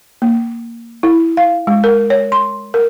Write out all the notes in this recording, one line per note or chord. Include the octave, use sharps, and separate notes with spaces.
A#3
E4
F5
G#3
A#4
C#5
C6
A#4